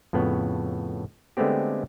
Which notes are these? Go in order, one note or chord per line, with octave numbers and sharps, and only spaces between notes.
F2 A2 C#3 B3
D3 G#3 A3 B3 C4 G4